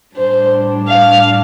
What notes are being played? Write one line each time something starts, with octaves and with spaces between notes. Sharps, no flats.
A2 G3 D4 C5
F5